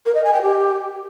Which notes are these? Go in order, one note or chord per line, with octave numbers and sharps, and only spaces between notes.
A#4
D#5
G#5
G5
G4